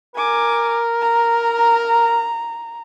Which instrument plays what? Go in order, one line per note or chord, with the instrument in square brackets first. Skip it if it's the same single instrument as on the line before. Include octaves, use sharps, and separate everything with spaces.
[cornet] A#4 [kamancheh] G#5 D6
[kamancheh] A#5